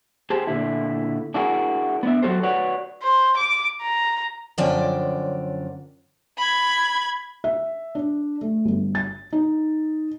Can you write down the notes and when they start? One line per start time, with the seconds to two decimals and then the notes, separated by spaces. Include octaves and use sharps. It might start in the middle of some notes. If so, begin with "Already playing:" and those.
0.30 G4 G#4 C5 A5
0.47 A#2 D3 E4
1.34 D4 E4 F#4 G#4 A#4
2.03 B3 D4 E5
2.23 F#3 F#4 A4 C5
2.43 F#4 B4 C#5 D5 F#5
3.03 C5
3.37 D6
3.82 A#5
4.58 F#2 D3 F3 C#4 D5 G5
6.38 B5 G#6
7.44 E5
7.95 D4
8.41 A3
8.65 G1
8.95 A6
9.33 D#4